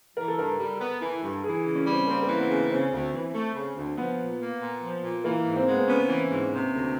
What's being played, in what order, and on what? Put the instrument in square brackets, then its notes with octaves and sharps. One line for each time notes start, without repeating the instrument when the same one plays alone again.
[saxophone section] E3 [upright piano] A#4
[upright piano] A4
[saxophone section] G2 [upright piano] A#4
[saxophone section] G3
B3
E3
G2
[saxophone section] E3 [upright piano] G#4
[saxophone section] C#3
[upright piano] C#4
[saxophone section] G3
[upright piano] C4
[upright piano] A#3 [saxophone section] C4
[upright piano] A#3
[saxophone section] E3
[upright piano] B3
[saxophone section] C#3
[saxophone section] C#3 [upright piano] C4
[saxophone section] D2
E3
A3
C#3
D2
[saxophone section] F3 [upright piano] B3
[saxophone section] A#2
A#3
A#2
F3
A#2
[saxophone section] E3 [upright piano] A#3
[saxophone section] G#2
[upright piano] C4
[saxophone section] G#3 [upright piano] B3
[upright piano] C4
[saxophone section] B3 [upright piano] C#4
[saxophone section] E3
G#2
C3
D2